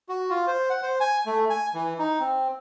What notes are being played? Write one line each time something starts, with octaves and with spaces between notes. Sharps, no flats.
F#4
F4
C5
F#5
C5
G#5
A3
G#5
E3
D#4
C4